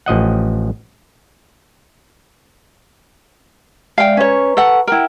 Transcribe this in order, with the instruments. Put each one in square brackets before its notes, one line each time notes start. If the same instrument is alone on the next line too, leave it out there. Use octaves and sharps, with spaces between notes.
[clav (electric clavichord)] A1 F3 D#5 F#5
[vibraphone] G#3 D5 E5 [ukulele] F5 G5
[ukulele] C#4 C#5 [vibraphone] B4 A#5 C#6
[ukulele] A4 F#5
[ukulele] E4 A#4 [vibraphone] F#5 G5